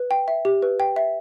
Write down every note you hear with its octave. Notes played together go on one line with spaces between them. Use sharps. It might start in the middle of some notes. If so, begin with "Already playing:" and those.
Already playing: B4
G5
E5
G4
B4
G5
E5